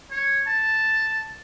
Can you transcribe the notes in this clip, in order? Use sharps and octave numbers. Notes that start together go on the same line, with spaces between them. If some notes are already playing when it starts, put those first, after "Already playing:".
C#5
A5